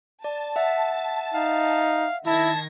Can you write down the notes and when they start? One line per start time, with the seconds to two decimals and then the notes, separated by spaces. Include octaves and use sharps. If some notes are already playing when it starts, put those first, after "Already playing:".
0.24 D5 A5
0.56 E5 F#5
1.34 D#4 F5
2.26 D#3 E4 A5 G#6 A#6